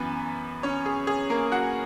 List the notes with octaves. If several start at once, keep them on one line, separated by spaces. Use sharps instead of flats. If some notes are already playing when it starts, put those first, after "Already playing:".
Already playing: F#2 E3 B3 B4
C#4 C#5
G#4
G#4
A#3 A#4
F#4 F#5